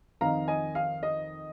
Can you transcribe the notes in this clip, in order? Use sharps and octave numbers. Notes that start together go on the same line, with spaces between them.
F2 D#3 C4 D#4 F5 A#5
D#5 G#5
F5
D#5